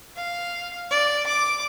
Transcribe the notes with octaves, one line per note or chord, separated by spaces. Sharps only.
F5
D5
D6